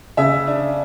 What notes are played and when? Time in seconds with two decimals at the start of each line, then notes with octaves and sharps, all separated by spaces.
0.17 C#3 E5
0.47 D4